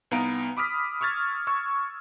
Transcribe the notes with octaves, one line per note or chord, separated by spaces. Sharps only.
C2 B3 D#4 F5 A#5 D7
B5 D6 D#6 F6 B6
C#6 E6 F6 G#6 A6
C#6 E6 G#6